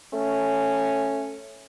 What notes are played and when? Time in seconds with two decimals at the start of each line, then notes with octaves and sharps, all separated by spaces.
0.13 A3 C#4